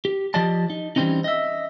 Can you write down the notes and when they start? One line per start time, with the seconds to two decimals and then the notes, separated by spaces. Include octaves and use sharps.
0.05 G4
0.34 F3 G4 D5 D#5 A5
0.70 D#4
0.96 E3 F#3 G3 C4 C#4 D#4
1.24 D#5 E5